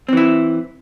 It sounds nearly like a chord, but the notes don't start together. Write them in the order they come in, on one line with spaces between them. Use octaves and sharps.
C4 E3 E4